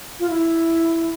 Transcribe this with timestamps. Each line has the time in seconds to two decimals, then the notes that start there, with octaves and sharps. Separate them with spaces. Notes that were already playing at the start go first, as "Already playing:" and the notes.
0.20 F4
0.30 E4